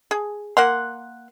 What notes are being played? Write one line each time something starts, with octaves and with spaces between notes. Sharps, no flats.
G#4
A#3 F#5 C6